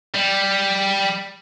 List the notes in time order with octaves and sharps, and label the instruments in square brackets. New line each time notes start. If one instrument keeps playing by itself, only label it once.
[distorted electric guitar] G3